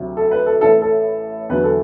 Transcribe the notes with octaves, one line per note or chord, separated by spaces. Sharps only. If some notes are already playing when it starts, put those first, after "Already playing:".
Already playing: D2 C3 F#3
A4
B4
A4
A1 A2 E3 A4
A4
E2 D3 F#3 B4
A4